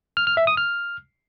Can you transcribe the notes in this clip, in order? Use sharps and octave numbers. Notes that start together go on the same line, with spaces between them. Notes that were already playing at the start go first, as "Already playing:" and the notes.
F6
F6
E5
D#6
F6